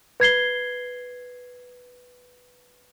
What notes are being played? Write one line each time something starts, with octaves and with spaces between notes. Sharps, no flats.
B4 G#6 C7 G7